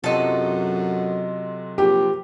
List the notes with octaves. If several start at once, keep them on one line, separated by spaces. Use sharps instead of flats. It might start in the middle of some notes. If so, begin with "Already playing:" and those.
F#2 C3 F#3 F4 A4 D#5
A#1 G4